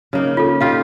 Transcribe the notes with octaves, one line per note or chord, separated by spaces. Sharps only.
C#3 A#3 D#4
F4 A4
D#4 F4 G4 F5